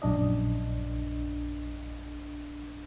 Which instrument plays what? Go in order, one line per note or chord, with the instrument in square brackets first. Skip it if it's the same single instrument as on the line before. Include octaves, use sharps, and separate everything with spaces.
[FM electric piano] A#1 F#2 D4 D#5